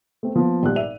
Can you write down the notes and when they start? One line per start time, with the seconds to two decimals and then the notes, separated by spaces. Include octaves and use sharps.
0.23 A3 C4
0.36 F3 A#3 B3
0.63 G#1 A#2 G3 F#6
0.76 D5 E5 D#7 F7